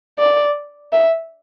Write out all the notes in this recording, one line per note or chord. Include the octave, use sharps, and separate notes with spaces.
D5
E5